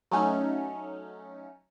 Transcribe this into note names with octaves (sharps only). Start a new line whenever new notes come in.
F#3 A3 C#4 D#4